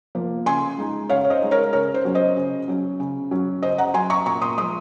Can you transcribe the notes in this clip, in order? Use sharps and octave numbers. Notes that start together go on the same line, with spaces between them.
F3 A#3
C#3 G#5 C6
G#3 D#4
C#3 C#5 F5
C#5
C5 D#5
G#3 D#4
A#4 C#5
C#3 A#4 C#5
C5
F#3 C#4
C5 D#5
C#3
F#3 C#4
C#3
F#3 C#4
C#3 C5 D#5
F#5 A#5
F#3 C#4 G#5 C6
A#5 C#6
A#2 A#5 C#6
C6 D#6
F3 G#3 C6 D#6